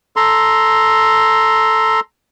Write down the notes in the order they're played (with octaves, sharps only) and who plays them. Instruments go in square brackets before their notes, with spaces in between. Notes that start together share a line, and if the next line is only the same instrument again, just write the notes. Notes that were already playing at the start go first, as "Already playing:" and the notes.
[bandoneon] A4 A#5 C6